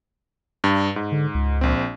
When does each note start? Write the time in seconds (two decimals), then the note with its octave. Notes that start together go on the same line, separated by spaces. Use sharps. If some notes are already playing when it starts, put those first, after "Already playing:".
0.64 G2
0.96 G#2
1.12 D3
1.35 C#2
1.61 A#1 C4